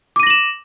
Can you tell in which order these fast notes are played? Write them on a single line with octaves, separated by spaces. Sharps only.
D6 D#7 A#6 F#7 E7